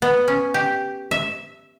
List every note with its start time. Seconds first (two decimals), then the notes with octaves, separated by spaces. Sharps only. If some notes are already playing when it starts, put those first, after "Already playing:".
0.02 B3
0.28 C#4
0.54 G4
1.11 E5